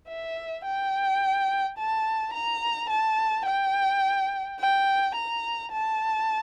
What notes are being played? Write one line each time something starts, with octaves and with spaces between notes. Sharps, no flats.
E5
G5
A5
A#5
A5
G5
G5
A#5
A5